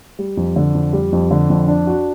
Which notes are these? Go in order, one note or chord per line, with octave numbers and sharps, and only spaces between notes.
G3
F2
D3
F2
G3
F2
D3
F2
D4
F#4